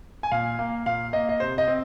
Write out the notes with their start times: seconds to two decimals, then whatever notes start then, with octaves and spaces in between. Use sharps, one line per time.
0.23 G#5
0.32 A#2 F5
0.59 A#3
0.86 A#2 F5
1.13 A#3 D#5
1.29 D#5
1.40 C3 C5
1.58 D#5
1.68 C4